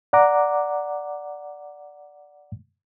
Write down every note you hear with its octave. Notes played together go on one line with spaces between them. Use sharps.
D5 F#5 A#5 D6